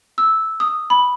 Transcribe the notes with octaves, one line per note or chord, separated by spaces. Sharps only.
E6
D#6
B5